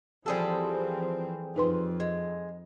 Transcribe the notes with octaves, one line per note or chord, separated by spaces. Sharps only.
E3 F3 G3 C4 G#4 A4
F2 D#4 B4 C6
G#3